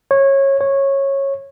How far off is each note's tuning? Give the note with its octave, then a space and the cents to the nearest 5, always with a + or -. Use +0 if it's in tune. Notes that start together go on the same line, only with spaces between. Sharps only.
C#5 -20
C#5 -15